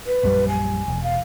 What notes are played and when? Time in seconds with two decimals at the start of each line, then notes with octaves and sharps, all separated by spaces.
0.07 B4
0.23 A#1 F#2 G3
0.48 G#5
0.88 E1
1.03 F5